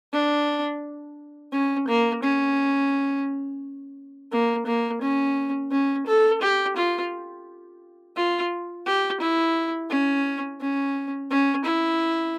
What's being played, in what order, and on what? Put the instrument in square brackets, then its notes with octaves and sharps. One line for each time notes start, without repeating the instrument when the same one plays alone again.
[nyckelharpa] D4
C#4
A#3
C#4
A#3
A#3
C#4
C#4
A4
G4
F4
F4
G4
E4
C#4
C#4
C#4
E4